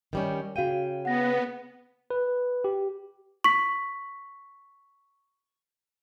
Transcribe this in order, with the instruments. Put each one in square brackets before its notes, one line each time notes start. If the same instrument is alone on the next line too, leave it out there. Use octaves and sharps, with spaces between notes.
[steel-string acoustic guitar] D#3 G3 C#4
[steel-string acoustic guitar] C#3 G5 [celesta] F#4 F5 D#7
[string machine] B3 [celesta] F#5 A#6
[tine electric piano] B4
G4
[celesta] C#6 B6